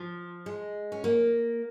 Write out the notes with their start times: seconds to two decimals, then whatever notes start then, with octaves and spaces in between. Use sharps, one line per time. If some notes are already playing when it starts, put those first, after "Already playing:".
Already playing: F3
0.46 G#3
0.92 C#4
1.04 A#3